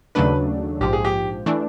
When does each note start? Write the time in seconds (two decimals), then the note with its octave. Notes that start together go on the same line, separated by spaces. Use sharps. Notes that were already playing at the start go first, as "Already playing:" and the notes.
0.15 D#2 C#3 F#3 A3 D4 B4
0.81 A#1 G#2 F3 G4
0.93 G#4
1.05 G4
1.46 E3 A3 D4